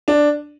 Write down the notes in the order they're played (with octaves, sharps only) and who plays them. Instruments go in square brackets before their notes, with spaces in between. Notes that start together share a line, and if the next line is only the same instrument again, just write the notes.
[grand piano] D4